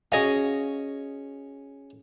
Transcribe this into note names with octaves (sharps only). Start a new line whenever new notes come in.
C#4 F#4 G#4 D#5 F5